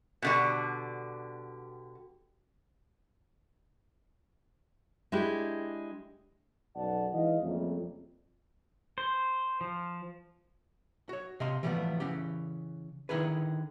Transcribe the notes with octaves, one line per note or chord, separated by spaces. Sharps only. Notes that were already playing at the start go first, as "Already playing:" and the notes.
B2 D3 G3
G#3 D4 E4 G4
B1 F#2 D5 F#5 A5
E3 G#3 D#4 D#5 F5
F2 C#3 G3 A3 A#3
C5
F3
F#4 C#5
C3 D#5 F5 C6
E3 F3 G3 A3 B3
C#3 E3 C#4 G4
D3 D#3 E4 G#4 B4